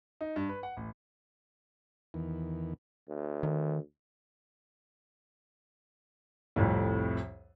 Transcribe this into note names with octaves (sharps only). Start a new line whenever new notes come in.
D#4
G2
B4
F#5
A1
E2 D#3 E3
D2
D#3
C2 F2 A2